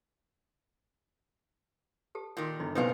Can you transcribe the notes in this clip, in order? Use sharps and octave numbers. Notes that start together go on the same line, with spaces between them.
G4 A4 A5
A#2 D#3
G1 E4 D#5 B5
F#1 B2 C4 D#4 B4 C5 F5 G#5